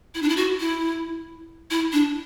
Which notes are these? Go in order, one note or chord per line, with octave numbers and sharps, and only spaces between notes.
E4
D4
E4
F#4
E4
E4
D4